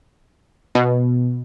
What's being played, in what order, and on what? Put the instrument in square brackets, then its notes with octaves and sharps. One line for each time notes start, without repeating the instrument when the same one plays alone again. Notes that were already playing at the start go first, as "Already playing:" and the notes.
[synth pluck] B2